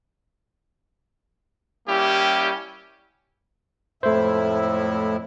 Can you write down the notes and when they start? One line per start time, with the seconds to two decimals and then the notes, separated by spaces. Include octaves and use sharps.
1.88 G3 A#3 C#4 E4 G4
4.03 F2 A2 A3 E4 C5